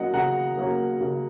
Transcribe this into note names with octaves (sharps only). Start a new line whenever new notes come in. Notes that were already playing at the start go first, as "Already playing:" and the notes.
Already playing: F#3 A#3 C#4 D#5 F#5
C#3 F#5 A#5
F#3 A#3 C#4
C#3